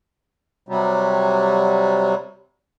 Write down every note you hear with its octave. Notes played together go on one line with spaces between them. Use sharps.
C3 F#3 G3